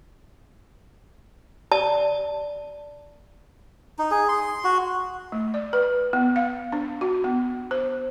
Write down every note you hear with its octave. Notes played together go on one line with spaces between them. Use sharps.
D5 A5
D#4
G#4
C6
F#4
A3
D5
B4
B3
F5
D4
F#4
B3
C5